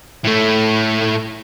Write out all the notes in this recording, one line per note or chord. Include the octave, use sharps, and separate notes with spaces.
A2 A3